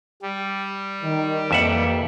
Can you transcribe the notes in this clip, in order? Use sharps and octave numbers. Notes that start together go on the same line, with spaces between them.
G3
D#3
F2 E3 A#3 E5 F#5